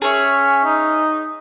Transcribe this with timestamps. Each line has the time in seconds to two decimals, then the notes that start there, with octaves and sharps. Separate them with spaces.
0.02 C#4 G#4 C#5 E5
0.64 D#4